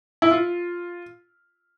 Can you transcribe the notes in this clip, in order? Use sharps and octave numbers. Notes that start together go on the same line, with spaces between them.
E4
F4